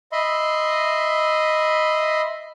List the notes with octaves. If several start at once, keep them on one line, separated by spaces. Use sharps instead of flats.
D#5 E5 B5 C6